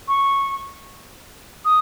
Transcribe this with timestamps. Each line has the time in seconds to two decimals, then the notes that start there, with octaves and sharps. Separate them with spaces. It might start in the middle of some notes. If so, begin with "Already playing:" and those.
0.08 C#6
1.65 D#6